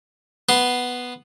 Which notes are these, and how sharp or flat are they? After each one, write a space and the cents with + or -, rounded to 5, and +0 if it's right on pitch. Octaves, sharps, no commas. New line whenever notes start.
B3 +0 C6 +0